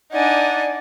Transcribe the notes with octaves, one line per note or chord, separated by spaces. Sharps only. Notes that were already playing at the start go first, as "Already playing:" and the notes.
D4 D#4 D5 F#5 G#5